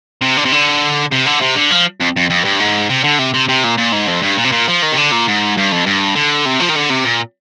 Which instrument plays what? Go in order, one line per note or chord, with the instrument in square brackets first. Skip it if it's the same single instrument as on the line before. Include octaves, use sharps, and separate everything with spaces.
[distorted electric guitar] C3
D3
C3
D3
C3
D3
C3
D3
F3
F2
F2
F2
G2
G#2
C3
D3
C3
C3
C3
A#2
A#2
G#2
F2
G2
A#2
C3
A#2
F3
D#3
C3
D3
A#2
G#2
G2
F2
G2
D3
C3
F3
D#3
D3
C3
A#2